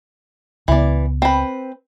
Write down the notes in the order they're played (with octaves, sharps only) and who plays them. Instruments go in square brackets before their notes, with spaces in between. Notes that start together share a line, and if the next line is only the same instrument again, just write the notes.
[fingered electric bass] C#2 C#3 B3 [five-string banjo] E3 D5
[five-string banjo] C4 B4